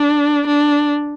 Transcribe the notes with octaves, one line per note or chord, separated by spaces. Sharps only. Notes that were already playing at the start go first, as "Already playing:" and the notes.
Already playing: D4
D4